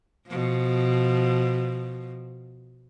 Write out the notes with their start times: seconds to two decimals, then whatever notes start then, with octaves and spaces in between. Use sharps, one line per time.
0.28 B2 F3